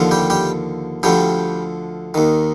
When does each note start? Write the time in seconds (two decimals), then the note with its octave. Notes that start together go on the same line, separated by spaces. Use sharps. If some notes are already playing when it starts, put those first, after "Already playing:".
Already playing: D#2 D3 F3
0.11 G3 G4
0.30 G3 G4
1.03 D2 D3 F3 G3 G4
2.14 D#2 D#3